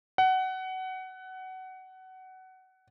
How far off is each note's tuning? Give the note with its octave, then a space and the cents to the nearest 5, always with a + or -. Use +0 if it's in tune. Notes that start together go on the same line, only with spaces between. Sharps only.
F#5 +20